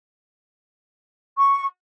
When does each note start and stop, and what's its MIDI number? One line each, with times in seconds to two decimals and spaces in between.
1.37 1.66 85